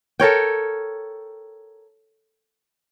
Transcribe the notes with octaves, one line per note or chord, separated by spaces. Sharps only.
A4 A#4 C#5 G5